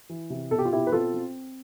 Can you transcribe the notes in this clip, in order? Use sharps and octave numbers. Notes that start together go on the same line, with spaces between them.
E3
C3
B2 A4
G4
F4
B2 E4 G4
B4
C4 F4 A4
C4